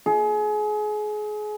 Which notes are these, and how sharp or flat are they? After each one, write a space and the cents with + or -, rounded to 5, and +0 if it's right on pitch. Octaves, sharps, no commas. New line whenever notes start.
G#4 +30